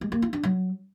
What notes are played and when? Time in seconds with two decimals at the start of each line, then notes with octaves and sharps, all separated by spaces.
0.01 G#3
0.12 A#3
0.22 F4
0.33 D4
0.43 F#3